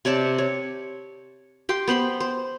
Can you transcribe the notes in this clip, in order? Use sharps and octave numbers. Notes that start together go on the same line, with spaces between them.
C3 C#5 D5 A5
C#5
G4 G5 C6
B3 C5 B5 C6
C5